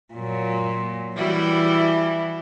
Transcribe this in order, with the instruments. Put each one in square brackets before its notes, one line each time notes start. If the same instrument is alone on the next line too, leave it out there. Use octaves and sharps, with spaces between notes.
[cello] A#2 F#3
[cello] E3 [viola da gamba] G3 E4 F#4